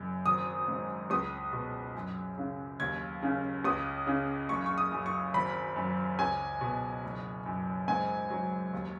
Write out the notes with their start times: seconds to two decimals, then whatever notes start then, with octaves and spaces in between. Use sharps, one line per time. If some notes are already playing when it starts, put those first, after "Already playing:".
Already playing: F#1 F#2
0.26 G#1 D#6
0.68 G#2
1.10 C#2 D#6
1.53 B2
1.95 F#2
2.38 C#3
2.80 D#2 G#6
3.23 C#3
3.64 C#2 D#6
4.07 C#3
4.49 F#1 C#6
4.66 C#6
4.78 D#6
4.92 F#2
5.06 C#6
5.34 G#1 B5
5.76 F#2
6.19 C#2 G#5
6.61 B2
7.03 F#1
7.46 F#2
7.88 G#2 G#5
8.30 F#3
8.73 D#2